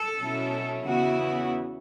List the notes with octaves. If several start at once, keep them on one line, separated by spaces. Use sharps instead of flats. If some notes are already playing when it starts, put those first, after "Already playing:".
Already playing: A4
B2 F#3 C#4 E4
E2 C#3 E3 B3 E4 F#4